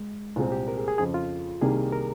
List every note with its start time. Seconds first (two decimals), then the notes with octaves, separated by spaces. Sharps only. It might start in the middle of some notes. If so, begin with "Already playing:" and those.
Already playing: G#3
0.36 C2 A#2 G#3 C4 F4
0.52 G4
0.68 A#4
0.78 G#4
0.88 G#4
0.98 F2 C#3 F3 G#4
1.14 F4
1.61 C2 C3 D#3 G3 A#3 G#4
1.92 A#4